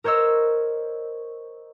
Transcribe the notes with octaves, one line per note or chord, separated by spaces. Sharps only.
A#4 C5 C#5 D#5 E6